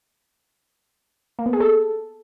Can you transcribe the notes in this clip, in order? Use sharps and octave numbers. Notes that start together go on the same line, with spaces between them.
A#3
B3
G#4
A4